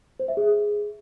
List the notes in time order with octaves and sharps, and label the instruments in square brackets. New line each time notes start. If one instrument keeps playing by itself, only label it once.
[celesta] C5
E5
G#4